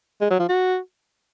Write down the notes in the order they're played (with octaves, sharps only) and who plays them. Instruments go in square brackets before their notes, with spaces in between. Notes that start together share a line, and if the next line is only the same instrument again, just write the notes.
[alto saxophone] G#3
F#3
F3
F#4